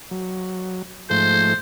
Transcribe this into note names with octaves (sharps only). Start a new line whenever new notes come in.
F#3
G#2 F3 A3 C5